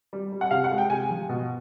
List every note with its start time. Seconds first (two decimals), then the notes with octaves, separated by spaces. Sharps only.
0.13 G3
0.32 G3
0.41 F#5
0.51 C3 F5
0.64 F#5
0.71 G#3
0.78 G5
0.90 C3 G#5
1.11 F3
1.29 B2